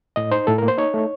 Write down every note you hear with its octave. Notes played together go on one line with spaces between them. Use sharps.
A2 D#5
D#4 C5
A2 A4
A#4
A#3
C5
D#4 C#5
A3